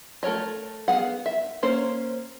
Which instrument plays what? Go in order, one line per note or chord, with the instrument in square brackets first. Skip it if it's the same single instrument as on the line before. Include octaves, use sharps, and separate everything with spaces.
[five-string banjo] A3 A4 A#4 C#5 D#5
B3 G#4 F5 F#5
E5
A#3 C#4 C5 C#5